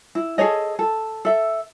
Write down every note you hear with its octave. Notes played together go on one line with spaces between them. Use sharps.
E4
G#4 A4 C#5 D#5
A4
A4 E5